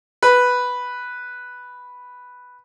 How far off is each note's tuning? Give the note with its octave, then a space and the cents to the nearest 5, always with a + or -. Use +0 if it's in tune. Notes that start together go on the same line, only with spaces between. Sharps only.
B4 +0